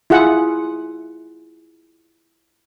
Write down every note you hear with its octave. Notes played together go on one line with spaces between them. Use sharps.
E4 F4 G#4 F#5